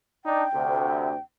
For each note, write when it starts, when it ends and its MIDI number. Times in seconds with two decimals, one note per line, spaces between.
0.25 0.43 62
0.25 0.43 63
0.25 1.20 79
0.54 1.13 38
0.54 1.13 48